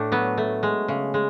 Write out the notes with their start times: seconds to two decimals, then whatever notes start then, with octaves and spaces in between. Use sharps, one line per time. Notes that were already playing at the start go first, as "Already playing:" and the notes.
Already playing: A2 A3 D4
0.12 F#3 B3
0.38 A3
0.63 G#3
0.88 C#3
1.14 G#3